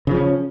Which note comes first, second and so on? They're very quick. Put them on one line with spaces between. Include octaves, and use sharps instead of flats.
C#3 F3 C#4